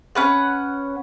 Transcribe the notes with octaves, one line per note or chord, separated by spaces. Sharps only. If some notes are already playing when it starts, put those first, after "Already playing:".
C#4 B4 F#5